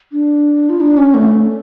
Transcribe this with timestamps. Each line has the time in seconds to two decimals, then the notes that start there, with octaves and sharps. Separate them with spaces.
0.12 D4
0.69 F4
0.80 D4
0.97 C#4
1.14 A3